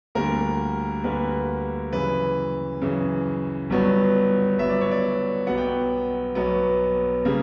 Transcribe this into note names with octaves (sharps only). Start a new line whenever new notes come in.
D2 D3 G3 A#3 A#4
D2 D3 G3 A#3 B4
F#2 C#3 E3 B4
F#2 C#3 E3
G1 G2 F#3 B3
G1 G2 F#3 B3 E5
D5
C#5
D5
B1 B2 F#3 B3 F#5
G5
F#5
B1 B2 F#3 B3
C#3 G3 A#3